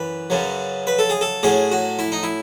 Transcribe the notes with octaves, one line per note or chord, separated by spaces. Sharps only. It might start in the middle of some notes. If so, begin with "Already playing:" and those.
Already playing: F#2 E3 B4
F#2 C#3 F#3
B4
A4
G#4
A4
A2 F#3 C#4 G#4
F#4
E4
D#4
E4